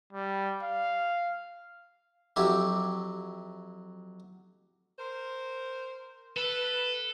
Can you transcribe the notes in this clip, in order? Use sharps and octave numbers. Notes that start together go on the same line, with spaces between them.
G3
F5
F2 F#3 E4 G4
A#4 C5
A4 B4